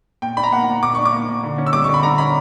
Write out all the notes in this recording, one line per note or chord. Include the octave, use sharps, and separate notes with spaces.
A#2 G5
D4 B5
A#5
A#3 F#5
A#2
A#2 D6
D4 C#6
D6
A#3
A#2
D3
C#4
E6
G3 D6
C#6
D3 B5
B5
D3 A#5
C#4 B5